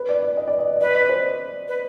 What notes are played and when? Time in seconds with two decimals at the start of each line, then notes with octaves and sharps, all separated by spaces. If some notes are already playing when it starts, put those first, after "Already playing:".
Already playing: B4
0.09 D5
0.22 D5
0.37 D#5
0.48 D5
0.59 D#5
0.76 D5
0.81 B4 D#5
0.95 D5
1.09 C5
1.68 B4